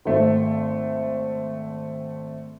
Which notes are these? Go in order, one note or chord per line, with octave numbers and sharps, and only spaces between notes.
G#1 A3 C4